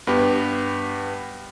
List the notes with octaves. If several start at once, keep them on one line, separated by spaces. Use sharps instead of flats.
G2 B3 G4